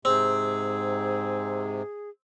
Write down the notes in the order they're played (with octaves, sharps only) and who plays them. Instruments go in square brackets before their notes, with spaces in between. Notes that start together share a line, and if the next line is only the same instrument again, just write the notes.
[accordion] G#2 C3 [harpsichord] C4 [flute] G#4